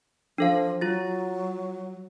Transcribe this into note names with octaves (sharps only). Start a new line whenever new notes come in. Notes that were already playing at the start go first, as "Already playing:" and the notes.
F3 D4 A4 F5
F#3 F4 A6